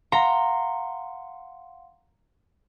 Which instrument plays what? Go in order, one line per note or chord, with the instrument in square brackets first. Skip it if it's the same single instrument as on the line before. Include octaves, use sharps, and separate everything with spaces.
[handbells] F5 F#5 C6 [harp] A#5